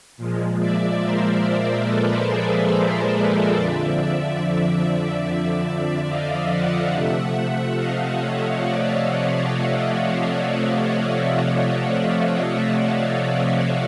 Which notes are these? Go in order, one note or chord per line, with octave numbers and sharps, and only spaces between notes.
A#2 F3 G#3
D5 E5
A#4 C5
A4 B4
G#4 A#4
F2 D3 F3 D5 E5
D5 E5
D#5 F5
E5 F#5
C3 F3 A3 E5 F#5
D#5 F5
C#5 D#5
D5 E5
E5 F#5
E5 F#5